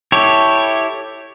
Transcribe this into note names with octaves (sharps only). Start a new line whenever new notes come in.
E4 G4 A4 C#5